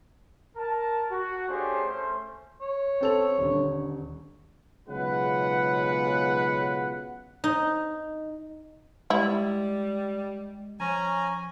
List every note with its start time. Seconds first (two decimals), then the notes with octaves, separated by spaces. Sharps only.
0.57 A#4 A5
1.11 F#4
1.49 A3 C#4 D4 G4 G#4 C5
1.86 A3 C#4 C5
2.62 C#5
3.01 C4 A4 F7
3.38 D#1 D3
4.88 B1 C#3 G#3 F4 B4 F#5
7.44 D#4
9.10 G3 G#3 E4
10.80 F3 C#4 G#5 A#5